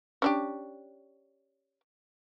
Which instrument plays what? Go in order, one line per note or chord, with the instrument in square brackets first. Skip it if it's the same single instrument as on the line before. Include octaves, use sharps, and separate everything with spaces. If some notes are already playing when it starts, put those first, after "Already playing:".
[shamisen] C#4 D4 G4